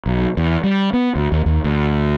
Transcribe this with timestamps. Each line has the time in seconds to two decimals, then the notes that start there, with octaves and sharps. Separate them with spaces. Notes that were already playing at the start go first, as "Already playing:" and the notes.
0.06 B1
0.37 E2
0.64 G3
0.93 B3
1.15 D2
1.32 D#2
1.46 D#2
1.64 D2